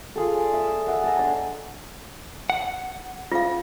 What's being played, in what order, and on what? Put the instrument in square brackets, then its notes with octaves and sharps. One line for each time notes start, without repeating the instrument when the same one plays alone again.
[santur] F4 G#4 A4
D5
E5 E6
D#5 E5 F#5 A#5
A4 G#5 A#5
D4 E5 C6
[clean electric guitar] F#5
[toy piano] F4 F5